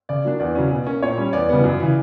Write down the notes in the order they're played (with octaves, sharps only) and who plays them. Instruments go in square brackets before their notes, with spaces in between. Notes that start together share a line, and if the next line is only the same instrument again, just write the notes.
[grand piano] C#3 [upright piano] D5
[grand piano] F#3 A#3 D4
[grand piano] E2 [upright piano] D5
[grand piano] C#3 F#3 C#4
B2
A#3 C#4
[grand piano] A#2 [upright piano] C#5
[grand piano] G3 C#4
[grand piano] E2 [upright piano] D5
[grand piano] C#3 E3 G3 B3
F#2
C#3 E3